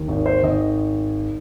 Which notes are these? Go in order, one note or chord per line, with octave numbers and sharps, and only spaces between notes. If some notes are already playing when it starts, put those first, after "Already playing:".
Already playing: D#2
G#1
C5
G#1 D#5